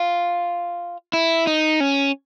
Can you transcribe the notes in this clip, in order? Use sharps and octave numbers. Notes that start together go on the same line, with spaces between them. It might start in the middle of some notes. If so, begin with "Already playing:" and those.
Already playing: F4
E4
D#4
C#4